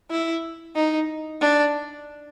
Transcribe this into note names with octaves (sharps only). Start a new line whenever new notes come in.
E4
D#4
D4